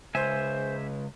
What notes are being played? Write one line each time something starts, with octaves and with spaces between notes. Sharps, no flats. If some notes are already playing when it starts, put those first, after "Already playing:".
C#2 C5 E5 G#5